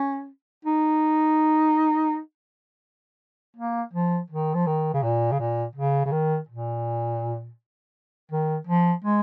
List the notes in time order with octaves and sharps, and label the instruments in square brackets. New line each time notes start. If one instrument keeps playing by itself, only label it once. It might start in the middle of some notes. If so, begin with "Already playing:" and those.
Already playing: [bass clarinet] C#4
D#4
A#3
F3
D#3
F3
D#3
C#3
A#2
C#3
A#2
C#3
C#3
D#3
A#2
D#3
F3
G#3